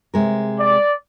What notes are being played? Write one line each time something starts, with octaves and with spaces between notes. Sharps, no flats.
C3 G#3 A#4
D5